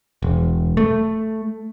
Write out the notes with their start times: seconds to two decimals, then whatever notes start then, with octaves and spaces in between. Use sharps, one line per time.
0.22 E1
0.77 A3